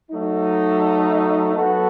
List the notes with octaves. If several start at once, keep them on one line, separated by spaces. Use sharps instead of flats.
F#3 A3 D#4
F#3 B3 F#4 A4